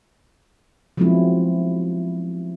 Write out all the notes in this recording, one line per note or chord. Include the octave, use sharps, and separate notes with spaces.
F3 F#3 G#3 B3 C4 E4